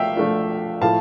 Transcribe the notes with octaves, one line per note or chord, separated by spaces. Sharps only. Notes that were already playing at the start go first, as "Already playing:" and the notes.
Already playing: F3 A3 E5 F5 G5
F3 A3 D4 F4
A2 F3 A3 F5 A5